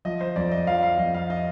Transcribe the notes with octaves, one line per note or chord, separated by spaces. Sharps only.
F3 D#5
C5
F2 D5
D#5
F3 F5
F5
F2 D#5
F5
D#5